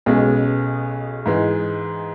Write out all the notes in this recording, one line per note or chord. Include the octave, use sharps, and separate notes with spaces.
B1 B2 G#3 C#4 G#4
G#2 E3 G#3